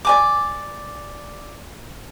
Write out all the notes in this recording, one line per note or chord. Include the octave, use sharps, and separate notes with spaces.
D5 G#5 D6